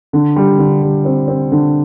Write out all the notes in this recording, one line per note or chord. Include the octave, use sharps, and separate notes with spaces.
D3
G3
D3
G3
C4
C4
D3